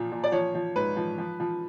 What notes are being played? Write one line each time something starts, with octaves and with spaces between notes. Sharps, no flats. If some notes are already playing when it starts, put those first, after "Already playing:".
Already playing: A#2 F3
A#2
D5
F3 C#5
F3
G#2 B4
F3
F3
F3